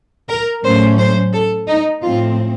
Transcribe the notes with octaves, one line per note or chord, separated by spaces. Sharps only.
A#4
A2 F#3 A3 C#4 C5
C5
A4
D#4
A2 F3 C4 F4